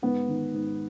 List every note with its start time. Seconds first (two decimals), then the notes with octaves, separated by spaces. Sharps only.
0.02 G#2 B3
0.28 D#3
0.54 G#2